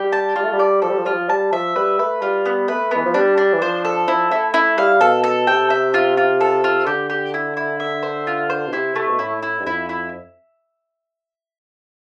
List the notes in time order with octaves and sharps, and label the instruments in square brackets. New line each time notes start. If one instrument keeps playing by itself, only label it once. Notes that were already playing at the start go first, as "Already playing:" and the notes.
Already playing: [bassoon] G3 [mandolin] G4
[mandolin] A5
[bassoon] G3 [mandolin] F4
[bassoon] A3
G3
[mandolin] D5
[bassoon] F3 [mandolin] A4
[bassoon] G3
F3
[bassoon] G3 [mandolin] F4
[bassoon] F3
[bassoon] G3 [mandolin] A5
[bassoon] F3 [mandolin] E5
[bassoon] G3 [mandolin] B4
[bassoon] A3 [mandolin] B4
[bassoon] G3 [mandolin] F4
[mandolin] B3
[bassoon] A3 [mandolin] B4
[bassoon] E3 [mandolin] B3
[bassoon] F3
[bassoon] G3 [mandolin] D4
[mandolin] D4
[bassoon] E3
[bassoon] F3 [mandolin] C5
[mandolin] A4
[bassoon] F3 [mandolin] E4
[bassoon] A3 [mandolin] E4
[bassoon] A3 [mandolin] E4
[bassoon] G3 [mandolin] F5
[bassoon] B2 [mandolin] A4
[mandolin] A4
[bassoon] C3 [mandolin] G5
[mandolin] E5
F4
F4
A4
F4
[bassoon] D3 [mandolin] G4
[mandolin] G4
E4
E4
E5
C5
F4
C5
[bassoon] B2
[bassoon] C3 [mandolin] E4
[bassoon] C3 [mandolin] A3
[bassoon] B2
[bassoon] A2 [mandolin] E4
[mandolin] E4
[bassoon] G2
[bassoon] F2 [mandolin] E4
[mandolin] E4